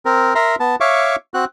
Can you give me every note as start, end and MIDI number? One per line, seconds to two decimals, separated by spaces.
0.05 0.34 60
0.05 0.34 70
0.35 0.56 70
0.35 0.56 76
0.35 0.56 82
0.35 0.56 84
0.60 0.76 59
0.60 0.76 81
0.80 1.16 73
0.80 1.16 76
0.80 1.16 77
0.80 1.16 85
0.80 1.16 86
1.34 1.45 60
1.34 1.45 66
1.34 1.45 90